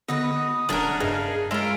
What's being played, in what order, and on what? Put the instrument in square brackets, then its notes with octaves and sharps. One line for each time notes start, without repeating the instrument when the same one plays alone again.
[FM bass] D3 [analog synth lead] B3 [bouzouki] D#4 F#4 B4
[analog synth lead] D#6
[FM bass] D#1 [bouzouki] F#3 A3 C#4 [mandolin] D4 A#4 [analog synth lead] G#5
[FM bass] G2 [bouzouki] C#3 D#4 [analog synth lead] G#4
[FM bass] G#3 [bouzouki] C#4 A#4 [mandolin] E4 F4 [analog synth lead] D7